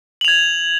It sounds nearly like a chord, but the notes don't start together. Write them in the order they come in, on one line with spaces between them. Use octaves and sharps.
F#7 F7 G#6